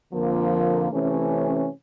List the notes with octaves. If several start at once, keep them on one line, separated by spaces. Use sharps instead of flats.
F2 D3 F3 A#3
C3 E3 A3 C#4